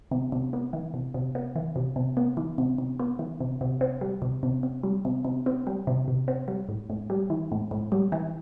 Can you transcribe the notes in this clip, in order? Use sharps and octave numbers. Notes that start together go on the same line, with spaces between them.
C3
C3
B3
E3
C3
C3
B3
E3
C3
C3
B3
E3
C3
C3
B3
E3
C3
C3
C4
G3
C3
C3
C4
G3
C3
C3
C4
G3
C3
C3
C4
G3
A2
A2
G3
E3
A2
A2
G3
E3